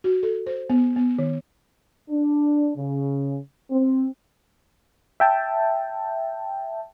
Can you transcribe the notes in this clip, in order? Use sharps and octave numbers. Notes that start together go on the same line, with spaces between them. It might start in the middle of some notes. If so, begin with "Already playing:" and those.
F#4
A4
C5
B3
B3
D#3
D4
C#3
C4
E5 G5 A5